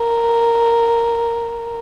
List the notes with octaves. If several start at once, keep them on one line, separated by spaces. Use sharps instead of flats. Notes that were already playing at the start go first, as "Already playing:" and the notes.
Already playing: A#4